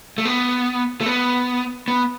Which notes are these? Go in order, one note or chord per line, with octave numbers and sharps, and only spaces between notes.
A3
B3
A3
B3
B3